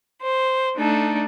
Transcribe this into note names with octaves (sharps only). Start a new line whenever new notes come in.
C5
A3 D4 D#4 A4